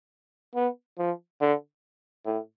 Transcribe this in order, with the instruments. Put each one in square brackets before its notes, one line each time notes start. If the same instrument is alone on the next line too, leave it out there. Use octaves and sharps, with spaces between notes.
[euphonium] B3
F3
D3
A2